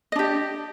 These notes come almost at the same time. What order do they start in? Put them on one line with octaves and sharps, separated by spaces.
D#5 D4 G4